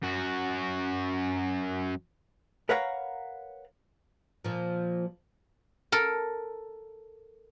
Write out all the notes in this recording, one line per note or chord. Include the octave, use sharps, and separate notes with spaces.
F#2 F#4
A#4 B4 C#5 F5 F#5 A#5
A#2 F3
A4 A#4